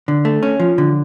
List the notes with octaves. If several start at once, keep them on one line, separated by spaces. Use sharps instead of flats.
D3
A3
C#4
F3
D3